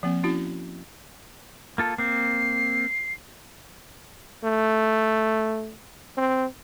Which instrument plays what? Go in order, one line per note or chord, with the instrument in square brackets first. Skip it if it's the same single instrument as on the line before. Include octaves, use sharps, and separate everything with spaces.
[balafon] F3 A#3 C4
C#4 E4 F#4
[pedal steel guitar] A#3 F4 A4
[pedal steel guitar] A#3 C4 [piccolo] C7
[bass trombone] A3
C4